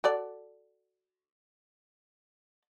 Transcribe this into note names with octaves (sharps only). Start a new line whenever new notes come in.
F#4 A4 D5